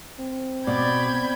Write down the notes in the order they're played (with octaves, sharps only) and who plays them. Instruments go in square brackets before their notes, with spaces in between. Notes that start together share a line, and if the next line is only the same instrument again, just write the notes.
[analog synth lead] C4
[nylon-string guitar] B2 [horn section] D5 [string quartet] B5 G6 G#6